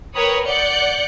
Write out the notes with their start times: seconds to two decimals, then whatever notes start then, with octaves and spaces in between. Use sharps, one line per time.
0.15 A#4 B4 C#5 G5 B5 D#6
0.47 D5 F#5 F#6 G6 C#7